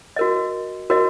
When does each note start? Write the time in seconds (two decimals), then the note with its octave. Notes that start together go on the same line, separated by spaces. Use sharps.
0.16 F#4 A#4 D#5
0.90 F#4 A#4 D#5